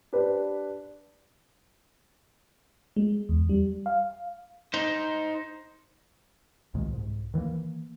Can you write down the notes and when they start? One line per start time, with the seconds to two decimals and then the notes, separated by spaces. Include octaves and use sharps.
0.13 D4 G4 B4 C5
2.96 G#3
3.29 E2
3.49 G3
3.86 F5
4.74 D#4 C5
6.74 C2 A#2 D#3 G#3
6.92 C2 G#2
7.34 D#3 E3 A3 A#3